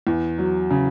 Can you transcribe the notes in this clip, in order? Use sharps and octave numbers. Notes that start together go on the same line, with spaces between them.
E2
F#3
C#3